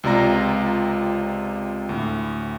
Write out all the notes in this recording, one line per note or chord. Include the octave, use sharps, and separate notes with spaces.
C#2 C3 F4 D5 A#5 A#6
D2 A2